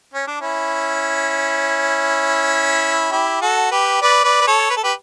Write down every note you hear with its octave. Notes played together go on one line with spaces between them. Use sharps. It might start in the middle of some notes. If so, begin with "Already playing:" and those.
C#4
D4
C#4 E4
E4 G4
F#4 A4
G4 B4
B4 D5
B4 D5
B4
A4 C#5
B4
A4
G4 B4